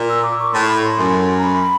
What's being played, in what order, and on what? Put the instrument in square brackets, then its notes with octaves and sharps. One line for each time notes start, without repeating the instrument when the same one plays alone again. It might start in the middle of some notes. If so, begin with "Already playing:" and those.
Already playing: [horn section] A#2
[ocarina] E6
D6
C#6
[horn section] A2 [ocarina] C6
[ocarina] B5
C6
[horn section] F#2
[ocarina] A#5
B5